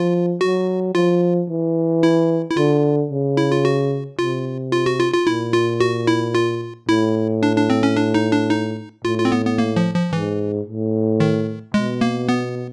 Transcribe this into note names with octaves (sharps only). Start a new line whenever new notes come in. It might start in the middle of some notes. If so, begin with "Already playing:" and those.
Already playing: F3 F4
F#3 F#4
F3 F4
E3
E4
E4
D3 F4
C#3
E4
F4
F#4
C3 F4
F4
F#4
F4
F4
A#2 E4
F4
F#4
E4
F4
A2 E4
D4
D4
C4
C#4
D4
D#4
D4
D#4
A2 F4
F4
C4
B3
B3
A#3
F3
F3
G#2 E3
A2
D#3
B2 G#3
A#3
B3